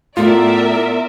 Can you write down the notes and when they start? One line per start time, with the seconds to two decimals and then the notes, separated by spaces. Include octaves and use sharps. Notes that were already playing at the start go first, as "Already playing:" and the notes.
0.17 A2 A3 B3 F4 A#4 D5 E5